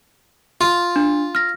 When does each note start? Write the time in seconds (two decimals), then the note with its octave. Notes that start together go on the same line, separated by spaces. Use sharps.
0.61 F4
0.96 D4
1.35 F6 A#6